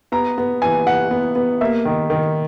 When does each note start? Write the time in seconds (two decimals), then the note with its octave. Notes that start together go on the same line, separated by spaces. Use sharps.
0.12 B3 A#5
0.38 B3
0.62 E3 G#5
0.86 E3 F#5
1.11 B3
1.35 B3
1.61 A#3 E5
1.85 D#3
2.10 D#3